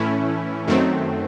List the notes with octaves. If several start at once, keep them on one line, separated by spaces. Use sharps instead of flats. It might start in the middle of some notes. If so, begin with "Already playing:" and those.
Already playing: A2 E3 A3 C#4 E4
F#2 D#3 F#3 A3 C4